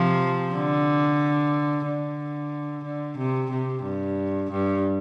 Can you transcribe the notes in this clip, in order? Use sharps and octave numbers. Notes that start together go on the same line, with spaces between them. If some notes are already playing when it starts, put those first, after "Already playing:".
Already playing: C3 F3
D3
D3
D3
C3
C3
G2
G2